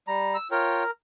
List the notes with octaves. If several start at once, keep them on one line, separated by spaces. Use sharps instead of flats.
G3 A#5
E6
F4 A#4 C#5 G5